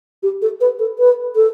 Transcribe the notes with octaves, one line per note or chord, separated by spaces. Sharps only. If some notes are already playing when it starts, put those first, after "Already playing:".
G4
A4
B4
A4
B4
A4